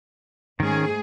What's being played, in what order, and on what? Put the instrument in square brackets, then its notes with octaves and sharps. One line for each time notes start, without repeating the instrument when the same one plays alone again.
[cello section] G#2 A3 G#4 [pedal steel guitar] D#3 C#4